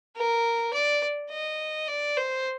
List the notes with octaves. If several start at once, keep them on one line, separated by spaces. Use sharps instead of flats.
A#4
D5
D#5
D5
C5